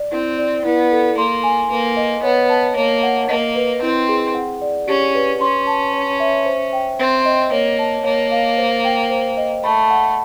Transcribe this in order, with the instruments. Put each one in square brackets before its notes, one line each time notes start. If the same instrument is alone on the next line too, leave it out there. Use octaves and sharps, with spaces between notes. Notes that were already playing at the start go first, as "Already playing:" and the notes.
Already playing: [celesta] D5
[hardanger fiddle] C4 [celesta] E4
[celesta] D5
[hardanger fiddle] B3 [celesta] E4
[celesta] A4
[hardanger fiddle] A#3 [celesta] C6
[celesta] G#5
[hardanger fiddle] A#3 [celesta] B4
[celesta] D#5
[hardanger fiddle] B3 [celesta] C#5
[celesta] A5
[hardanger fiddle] A#3 [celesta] C#5
[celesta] F#5
[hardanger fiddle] A#3 [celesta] D#5
[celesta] B4
[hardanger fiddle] C4 [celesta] E4
[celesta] G#4
F#5
D5
[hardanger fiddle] C#4 [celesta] G4
[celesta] B4
[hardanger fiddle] C#4 [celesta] C6
[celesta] A5
C#5
E5
C5
G5
[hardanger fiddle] C4 [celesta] C5
[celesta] D#5
[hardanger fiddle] A#3 [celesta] C#5
[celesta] A5
[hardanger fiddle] A#3 [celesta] C#5
[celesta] F5
C5
G5
C5
D#5
[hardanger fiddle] A3 [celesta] B5
[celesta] F#5